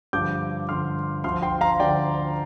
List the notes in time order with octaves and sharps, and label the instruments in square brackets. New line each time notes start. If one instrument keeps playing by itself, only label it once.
[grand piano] G2 D3 F3 D6 G6
G2 D3 F3 C6 F6
D2 D3 F3 C6 F6
G5 C6
F5 A#5
D2 D3 F3 D5 G5